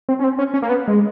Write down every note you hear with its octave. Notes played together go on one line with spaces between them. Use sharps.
C4
C#4
C4
C#4
C#4
A#3
B3
G#3